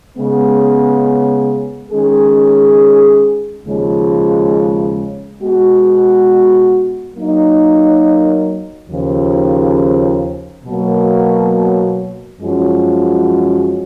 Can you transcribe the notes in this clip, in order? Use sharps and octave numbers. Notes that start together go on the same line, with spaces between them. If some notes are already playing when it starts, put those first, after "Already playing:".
C#3 G#3 B3
D#3 G#3 C#4 G#4
D#2 C#3 F3 G#3
B2 G#3 B3 F#4
F#3 A#3 D#4
D#2 C#3 F3
B2 F#3 A#3
F#2 F3 G#3 C#4 F#4